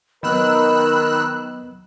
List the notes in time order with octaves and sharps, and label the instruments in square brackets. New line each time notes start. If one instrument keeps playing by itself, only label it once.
[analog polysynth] D#3 E6 F#6 [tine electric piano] F#3 B3 D#5 [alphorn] A#4 [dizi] B5